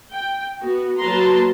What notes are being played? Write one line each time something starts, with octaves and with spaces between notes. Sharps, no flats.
G5
B3 F#4
F#3 A#3 B4 A5 A#5 C6